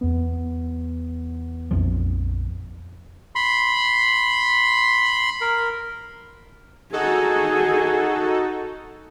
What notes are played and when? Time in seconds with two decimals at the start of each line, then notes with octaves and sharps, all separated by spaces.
0.01 E2 B3
1.71 A#1 F2 F3
3.35 B5 C6
5.41 A#4
6.93 D#4 F#4 G#4 A4